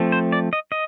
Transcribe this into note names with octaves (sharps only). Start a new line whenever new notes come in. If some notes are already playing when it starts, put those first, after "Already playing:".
Already playing: F3 A3 C4
C5
D5
D#5
D#5